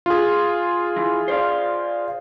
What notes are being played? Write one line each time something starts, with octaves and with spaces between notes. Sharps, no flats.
F4 G#4
E3
C5 D5 F5